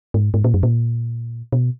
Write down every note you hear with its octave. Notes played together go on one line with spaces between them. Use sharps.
G#2
G#2
A#2
F#2
A#2
B2